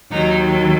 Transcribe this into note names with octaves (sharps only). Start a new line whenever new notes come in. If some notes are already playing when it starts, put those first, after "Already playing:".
D#2 D#3 F#3 D#4